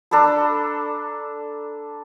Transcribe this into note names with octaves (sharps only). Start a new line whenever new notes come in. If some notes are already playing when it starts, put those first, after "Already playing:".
D4 A4 A#5 B5